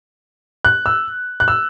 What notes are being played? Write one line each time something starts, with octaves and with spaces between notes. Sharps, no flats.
F#6
E6
F#6
E6